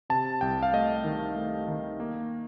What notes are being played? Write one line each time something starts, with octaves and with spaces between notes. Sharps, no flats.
C3 A5
C2 G5
F5
A3 D#5
D#3
A3
D#3
A#3